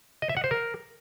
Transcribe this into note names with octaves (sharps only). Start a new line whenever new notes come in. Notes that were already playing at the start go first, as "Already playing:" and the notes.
D#5
E5
F#5
C5
A#4